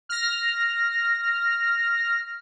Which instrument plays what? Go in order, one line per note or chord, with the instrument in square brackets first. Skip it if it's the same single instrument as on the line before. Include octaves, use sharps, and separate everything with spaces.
[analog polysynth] F6 A#6